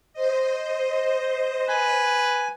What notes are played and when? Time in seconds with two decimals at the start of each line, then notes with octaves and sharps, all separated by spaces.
0.13 C5 D#5
1.69 B4 G#5